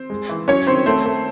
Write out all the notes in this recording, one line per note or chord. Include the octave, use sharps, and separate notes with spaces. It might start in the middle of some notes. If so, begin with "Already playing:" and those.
Already playing: C4 C5
G#3
E3
F#3 C#4 C#5
D#3 C4 C5
A3 C4 C5
A3